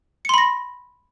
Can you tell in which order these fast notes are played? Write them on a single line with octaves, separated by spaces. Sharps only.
C#7 C6 B5 A#6